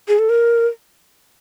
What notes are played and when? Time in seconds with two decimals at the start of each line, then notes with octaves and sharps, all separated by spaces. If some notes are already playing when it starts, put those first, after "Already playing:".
0.08 G#4
0.19 A4
0.29 A#4